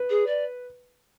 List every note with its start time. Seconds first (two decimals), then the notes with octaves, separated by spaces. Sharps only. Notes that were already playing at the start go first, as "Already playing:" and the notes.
Already playing: B4
0.10 G#4
0.27 D5